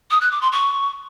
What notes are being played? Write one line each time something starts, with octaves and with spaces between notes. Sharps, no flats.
D#6
F#6
D6
C6
C#6